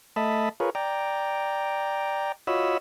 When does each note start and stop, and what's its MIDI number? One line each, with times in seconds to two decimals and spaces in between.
0.16 0.49 57
0.16 0.49 75
0.16 0.49 76
0.16 0.49 81
0.16 0.49 83
0.60 0.70 65
0.60 0.70 68
0.60 0.70 70
0.60 0.70 71
0.60 0.70 73
0.75 2.32 74
0.75 2.32 79
0.75 2.32 82
2.47 2.78 65
2.47 2.78 66
2.47 2.78 73
2.47 2.78 75
2.47 2.78 83
2.47 2.78 88